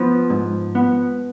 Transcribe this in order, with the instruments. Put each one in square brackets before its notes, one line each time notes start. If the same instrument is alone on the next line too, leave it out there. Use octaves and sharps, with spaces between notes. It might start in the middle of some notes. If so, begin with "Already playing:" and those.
Already playing: [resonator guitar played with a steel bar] F3 [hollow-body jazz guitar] B3
[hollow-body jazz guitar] G#2
B3